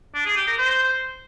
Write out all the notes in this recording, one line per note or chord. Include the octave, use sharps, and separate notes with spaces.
D4
G#4
G4
A#4
C5